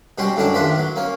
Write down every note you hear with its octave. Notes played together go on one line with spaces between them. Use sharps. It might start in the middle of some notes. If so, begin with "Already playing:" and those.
B2 G3 C#4 F#4 C6
F#2 A2 D3 C#4 D4 F#4
D#2 A2 D4 F4 B4
F#3
A#3 C#4